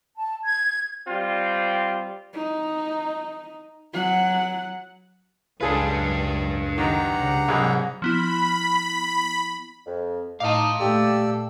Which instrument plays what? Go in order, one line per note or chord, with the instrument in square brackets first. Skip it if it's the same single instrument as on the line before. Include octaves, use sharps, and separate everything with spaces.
[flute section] A5
G#6
[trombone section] G3 C4 F4
[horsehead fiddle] D#4
F#3 F#5
[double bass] C#2 F#2 [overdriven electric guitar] D4 B4 [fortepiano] F4 G#4 A4
[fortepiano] D#3 [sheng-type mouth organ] G4 F#5 A#5
[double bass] C#2 C#3
[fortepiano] C2 G#2 G#4 [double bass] C3 F#3
[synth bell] F3 B3 E4 [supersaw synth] B5
[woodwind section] F2
[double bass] A2 [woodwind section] D#4 [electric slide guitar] F5 A5 [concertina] D6
[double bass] A#2 A3 [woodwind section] G4 [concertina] A4 D5 E6